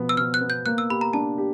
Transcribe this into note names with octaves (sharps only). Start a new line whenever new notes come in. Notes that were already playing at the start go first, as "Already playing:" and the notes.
Already playing: B2 F3 B3
E6
B2 F6
F#6
B3
G6
A#3 F#6
E6
G4 B5
A#5
D4 A5
G4